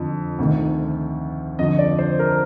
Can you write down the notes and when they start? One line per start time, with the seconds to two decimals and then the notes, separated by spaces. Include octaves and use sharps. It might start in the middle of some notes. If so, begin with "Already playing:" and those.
Already playing: F2 D3 F3
0.39 D2 C3 D#3
1.59 F2 D3 F3 D#5
1.79 D5
1.99 C5
2.19 A#4